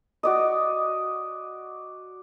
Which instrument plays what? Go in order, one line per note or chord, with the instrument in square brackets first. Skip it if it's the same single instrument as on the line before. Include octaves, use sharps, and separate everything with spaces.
[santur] F#4 D5 D#5